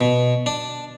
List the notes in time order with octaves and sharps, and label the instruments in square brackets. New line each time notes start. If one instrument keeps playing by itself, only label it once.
[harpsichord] B2
D4